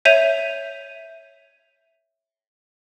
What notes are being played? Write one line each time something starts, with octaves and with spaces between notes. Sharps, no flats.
C#5 E5 G6 D#7 F7